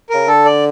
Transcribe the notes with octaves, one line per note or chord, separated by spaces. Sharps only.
C#3 A#4
D3 A4
D5